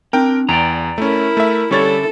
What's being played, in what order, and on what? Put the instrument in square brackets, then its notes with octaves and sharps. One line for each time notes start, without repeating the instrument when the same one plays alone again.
[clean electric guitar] C4 D4 [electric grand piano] A#4 G5
[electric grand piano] E2 [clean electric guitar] D5 G5 A#5
[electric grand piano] A3 C#4 [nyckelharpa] E4 A#4
[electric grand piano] A3 E5
[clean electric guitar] D3 C#4 E4 [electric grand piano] G3 C#5 A6 [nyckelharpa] A4